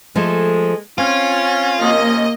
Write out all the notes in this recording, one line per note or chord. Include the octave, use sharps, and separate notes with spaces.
F3 G#3 A3 A4
C4 C#4 F4
C3 F3 A#3 C#4 D#5